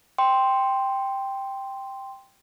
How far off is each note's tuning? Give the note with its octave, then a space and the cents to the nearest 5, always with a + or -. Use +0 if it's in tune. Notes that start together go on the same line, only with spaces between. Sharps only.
G5 +0 C6 +0